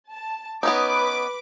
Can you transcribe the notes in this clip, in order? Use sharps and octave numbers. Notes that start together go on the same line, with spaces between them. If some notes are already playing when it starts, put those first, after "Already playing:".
A5
B3 C#4 D#4 B4 D6